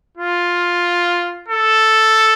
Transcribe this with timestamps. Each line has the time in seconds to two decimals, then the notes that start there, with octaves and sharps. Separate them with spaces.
0.17 F4
1.49 A4